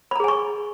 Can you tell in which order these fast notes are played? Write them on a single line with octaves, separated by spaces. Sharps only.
B5 A#5 G#4 G#5 C#6